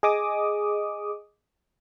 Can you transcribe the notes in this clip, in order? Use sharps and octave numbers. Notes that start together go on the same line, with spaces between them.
G#4 D#5 D6 D#6